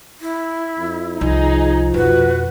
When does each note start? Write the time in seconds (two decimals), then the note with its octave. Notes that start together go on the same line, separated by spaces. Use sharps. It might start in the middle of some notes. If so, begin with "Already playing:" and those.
0.21 E4
0.79 F2
1.21 C2 F3 D#4 G#4
1.94 F2 B2 F#4 B4